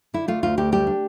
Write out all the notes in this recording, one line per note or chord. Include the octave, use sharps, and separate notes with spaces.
D3 E4
A3 F4
D2 F4
D2 G4
G3 G4
D4